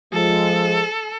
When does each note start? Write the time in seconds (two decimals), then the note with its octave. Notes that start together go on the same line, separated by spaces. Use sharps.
0.13 F3 G#3 A4